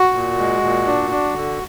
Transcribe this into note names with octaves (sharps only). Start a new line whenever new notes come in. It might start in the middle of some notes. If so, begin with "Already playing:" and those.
Already playing: F#4
A#2
G#3
A#2
D4
D4
D3